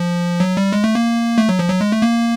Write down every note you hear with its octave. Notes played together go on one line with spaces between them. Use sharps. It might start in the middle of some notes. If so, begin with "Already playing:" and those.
Already playing: F3
F#3
G3
G#3
A3
A#3
A3
F#3
F3
F#3
G#3
A3
A#3